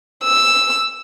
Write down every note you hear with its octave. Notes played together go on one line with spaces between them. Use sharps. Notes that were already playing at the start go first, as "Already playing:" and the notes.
E6